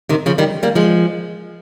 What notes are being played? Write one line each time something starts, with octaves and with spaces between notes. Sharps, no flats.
C3 D#3
C#3 F3
D#3 G3
G3 A#3
F3 G#3